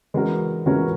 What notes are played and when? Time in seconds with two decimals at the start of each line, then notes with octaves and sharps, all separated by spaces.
0.14 E3 G#3 C#4 F#4 A#4
0.66 E3 G#3 C#4 F#4 A#4